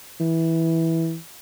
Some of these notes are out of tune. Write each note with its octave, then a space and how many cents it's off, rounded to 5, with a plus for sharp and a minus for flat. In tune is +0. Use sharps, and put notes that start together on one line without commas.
E3 -10